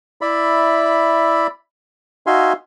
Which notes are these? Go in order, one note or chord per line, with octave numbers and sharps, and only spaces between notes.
E4 D5 E5 B5
D#4 F#4 E5 F5 G#5 C6